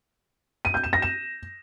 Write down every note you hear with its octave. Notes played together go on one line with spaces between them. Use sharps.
D#7
G6
E7
A#6
E7